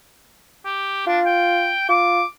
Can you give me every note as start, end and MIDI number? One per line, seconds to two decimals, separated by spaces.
0.65 1.03 67
1.07 1.19 62
1.07 1.72 65
1.26 1.86 79
1.89 2.22 65
1.89 2.26 86